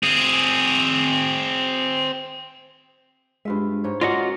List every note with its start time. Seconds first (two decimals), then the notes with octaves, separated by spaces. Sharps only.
0.03 C4 G#4
3.45 G2 G#3 F4 E5
3.84 G#2 C#5
4.01 A#3 C#4 F4 F#4 G#4 D5 D#5 F#5